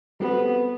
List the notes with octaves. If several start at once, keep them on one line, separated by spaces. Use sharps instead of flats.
G3 B3 C4 F#4 A4